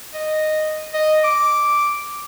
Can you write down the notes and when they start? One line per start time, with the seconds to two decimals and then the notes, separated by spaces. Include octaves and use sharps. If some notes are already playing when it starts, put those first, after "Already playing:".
0.14 D#5
0.94 D#5
1.24 D6